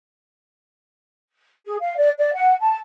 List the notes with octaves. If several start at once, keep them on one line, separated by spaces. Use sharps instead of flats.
G#4
F5
D5
D5
F#5
A5